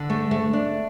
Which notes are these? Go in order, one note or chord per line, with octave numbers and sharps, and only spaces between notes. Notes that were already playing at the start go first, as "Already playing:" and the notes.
Already playing: D3
A3
A3
D4